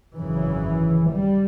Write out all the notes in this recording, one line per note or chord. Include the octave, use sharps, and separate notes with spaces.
G#1 F#2 C#3 E3
G3